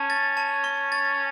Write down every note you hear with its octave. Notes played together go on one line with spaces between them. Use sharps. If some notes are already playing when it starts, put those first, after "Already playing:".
Already playing: C#4 A5
A6
A5
C#6
A6